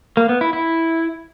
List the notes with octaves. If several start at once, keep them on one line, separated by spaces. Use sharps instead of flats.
A#3
B3
E4
E4